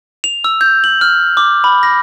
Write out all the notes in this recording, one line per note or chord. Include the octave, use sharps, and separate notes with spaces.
F7
E6
G6
F#7
F6
D6
B5
A#6